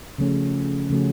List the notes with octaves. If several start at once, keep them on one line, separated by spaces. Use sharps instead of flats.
C#3 F3 A3 C#4 F#4
C#3 F3 A3 C#4 F#4